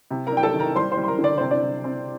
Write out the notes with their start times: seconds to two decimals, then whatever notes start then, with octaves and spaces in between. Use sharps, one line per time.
0.11 C3
0.27 A#4 A#5
0.32 D4 G5
0.43 A4 A5
0.54 D#3
0.60 A#4 A#5
0.75 G3 C5 C6
0.92 C5 C6
0.97 G3
1.04 C6
1.08 A#4 A#5
1.19 D3
1.24 D5
1.38 C3 C5
1.51 D4 D5
1.62 C3
1.84 C4